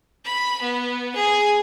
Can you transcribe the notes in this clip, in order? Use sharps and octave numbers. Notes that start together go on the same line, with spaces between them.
B5
B3
G#4